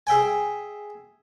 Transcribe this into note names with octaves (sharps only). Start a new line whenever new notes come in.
G#4 E5 G5 G#5